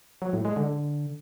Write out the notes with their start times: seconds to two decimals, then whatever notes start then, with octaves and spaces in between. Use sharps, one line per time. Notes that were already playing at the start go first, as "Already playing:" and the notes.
0.22 F#3
0.33 A2
0.45 G#3
0.56 D3